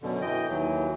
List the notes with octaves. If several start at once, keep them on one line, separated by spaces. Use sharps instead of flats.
F#2 B2 D3
E3 D#5 G5
D#2 E3 F#3